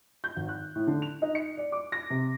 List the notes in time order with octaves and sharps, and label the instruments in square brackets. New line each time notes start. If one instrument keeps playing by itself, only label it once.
[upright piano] G6
G#1
F#6
A2
D3
F7
D#4
C#7
D5
D6
A#6
C3